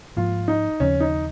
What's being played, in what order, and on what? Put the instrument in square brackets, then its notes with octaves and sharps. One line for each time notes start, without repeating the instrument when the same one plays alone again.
[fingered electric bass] G#2 F3 A#3 [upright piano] F4
[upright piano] D#4
[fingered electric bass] D#2 C#3 F3 C4 [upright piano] C#4
[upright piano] D#4